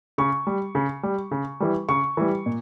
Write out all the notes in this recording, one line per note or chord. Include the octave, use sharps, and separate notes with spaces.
C#3 C#6
G3
C#3
G3
C#3
E3 G3
C#3 C#6
E3 G3
A#2